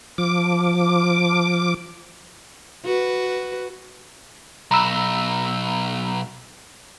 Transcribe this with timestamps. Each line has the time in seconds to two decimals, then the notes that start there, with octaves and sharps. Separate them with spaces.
0.18 F3 D6
2.84 F#4 B4
4.71 B1 A#5 B5 E6